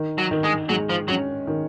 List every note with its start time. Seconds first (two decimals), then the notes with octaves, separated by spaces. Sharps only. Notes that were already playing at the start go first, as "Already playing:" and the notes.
Already playing: D#3
0.18 F#3
0.31 D#3
0.44 G#3
0.69 F#3 G#3
0.89 F3
1.08 F#3 C#4
1.47 D#3